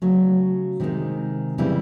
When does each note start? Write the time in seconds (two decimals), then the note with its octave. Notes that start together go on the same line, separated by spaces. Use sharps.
0.02 C#3 F#3 A3
0.80 C3 D#3 G#3 C4 D#4
1.58 C#3 E3 G3 C4 E4